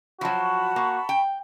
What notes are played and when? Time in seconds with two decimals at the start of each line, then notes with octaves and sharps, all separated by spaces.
0.21 F3 F#3 F#4 A5 B5 C#6
0.76 A#3
1.09 G5